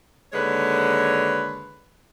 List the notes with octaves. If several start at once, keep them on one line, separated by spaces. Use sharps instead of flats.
D#2 D3 G#3 B4 C#5